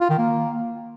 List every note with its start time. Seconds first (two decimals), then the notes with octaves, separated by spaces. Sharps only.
0.01 F4
0.10 D#3
0.18 A#3